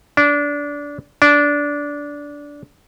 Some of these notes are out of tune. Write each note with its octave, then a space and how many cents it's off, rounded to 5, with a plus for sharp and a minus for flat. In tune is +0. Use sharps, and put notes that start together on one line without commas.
D4 -20
D4 -15